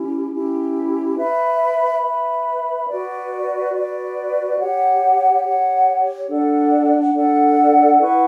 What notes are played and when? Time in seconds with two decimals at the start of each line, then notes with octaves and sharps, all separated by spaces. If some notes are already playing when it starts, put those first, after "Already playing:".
Already playing: C#4 E4 G4
0.31 C#4 E4 G4
1.17 B4 E5 B5
2.02 B4 E5 B5
2.88 F#4 B4 D5
3.72 F#4 B4 D5
4.58 G4 C#5 F#5
5.44 G4 C#5 F#5
6.29 D4 A4 D5 F#5
7.14 D4 A4 D5 F#5
8.00 E4 B4 F#5 C#6